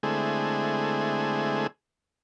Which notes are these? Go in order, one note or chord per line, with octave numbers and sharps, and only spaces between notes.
D3 G#3 A3 C4 E4 G#4